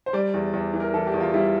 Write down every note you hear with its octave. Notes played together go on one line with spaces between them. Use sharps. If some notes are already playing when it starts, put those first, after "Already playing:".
C5
G3 D5
E2
E2
E3
A#4
E3 A4
G4
E2
F4
G3 E4